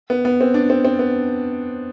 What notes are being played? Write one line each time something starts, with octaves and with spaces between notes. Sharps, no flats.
B3
B3
C4
D4
C4
C4
B3